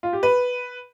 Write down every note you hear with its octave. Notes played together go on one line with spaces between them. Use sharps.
F4
G4
B4